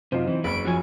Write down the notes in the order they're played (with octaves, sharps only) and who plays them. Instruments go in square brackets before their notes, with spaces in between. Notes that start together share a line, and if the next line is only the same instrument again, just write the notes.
[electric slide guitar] F#2 C3 [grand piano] D#4 C5 [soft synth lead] F4
[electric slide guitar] E3 [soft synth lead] C4
[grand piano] F#1 [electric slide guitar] B4 C#5 [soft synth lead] D7
[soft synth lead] F3 [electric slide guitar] F#4 C#5 G#5